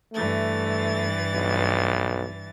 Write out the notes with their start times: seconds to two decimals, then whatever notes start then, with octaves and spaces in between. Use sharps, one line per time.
0.13 G2 E3 A3 A6
1.34 B1